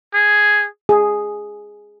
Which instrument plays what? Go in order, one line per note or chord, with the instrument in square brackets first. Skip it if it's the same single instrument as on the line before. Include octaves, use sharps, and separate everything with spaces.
[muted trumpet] G#4
[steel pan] G#4